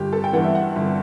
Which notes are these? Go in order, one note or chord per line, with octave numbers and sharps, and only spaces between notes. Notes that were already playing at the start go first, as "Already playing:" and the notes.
Already playing: G1 G4
A4
G5
G2 E3 F#5
E5
F#5
G1